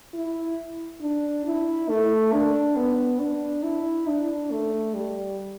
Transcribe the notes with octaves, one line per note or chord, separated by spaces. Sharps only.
E4
D4
E4
A3
D4
B3
D4
E4
D4
A3
G3